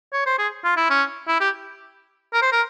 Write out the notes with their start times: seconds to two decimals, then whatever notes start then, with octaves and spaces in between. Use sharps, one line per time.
0.13 C#5
0.26 C5
0.39 G#4
0.64 F4
0.77 E4
0.90 C#4
1.28 E4
1.40 G4
2.34 A#4
2.42 C5
2.52 A#4